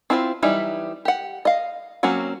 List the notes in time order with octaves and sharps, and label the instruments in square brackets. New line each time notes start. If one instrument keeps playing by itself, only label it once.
[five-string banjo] C4 E4 F4 A4 C5
E3 F#3 G3 D#4 E4
G4 F#5
D#5 F5
F#3 A#3 C4 C#4 F#4